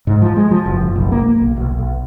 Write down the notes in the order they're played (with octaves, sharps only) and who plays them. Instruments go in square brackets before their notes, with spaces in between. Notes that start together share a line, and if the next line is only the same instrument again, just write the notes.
[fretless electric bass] G#2
F3
G#3
F3
F#1
F#1
B1
A#3
A#3
B1
B1
B1